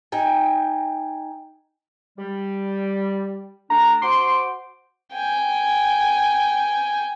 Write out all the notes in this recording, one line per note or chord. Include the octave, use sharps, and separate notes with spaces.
D#4 G5 G#5
G3
A3 D4 A#5
F#4 C5 C6 D6
G5 G#5